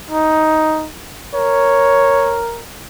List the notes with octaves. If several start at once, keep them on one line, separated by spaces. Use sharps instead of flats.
D#4
A#4 C#5